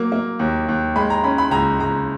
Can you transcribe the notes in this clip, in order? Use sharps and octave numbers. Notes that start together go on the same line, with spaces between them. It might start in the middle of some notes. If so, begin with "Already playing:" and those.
Already playing: F#3 A#3
A#3
D#2
D#2
G#3 B5
A#5
C#4 B5
B5
C#2 A#5
C#2 A#5